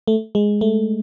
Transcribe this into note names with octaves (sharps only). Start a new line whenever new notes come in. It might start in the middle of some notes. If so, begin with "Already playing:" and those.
A3
G#3
A3